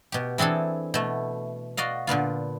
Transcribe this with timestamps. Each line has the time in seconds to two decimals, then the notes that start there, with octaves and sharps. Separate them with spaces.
0.12 B2 G4
0.38 E3 C4 D4 G#4 A4
0.94 B2 A3
1.77 F#4 D5 D#5 F5
2.07 A#2 D3 B3 F4